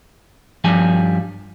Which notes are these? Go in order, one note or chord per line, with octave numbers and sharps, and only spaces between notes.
G2 F3 G3 G#5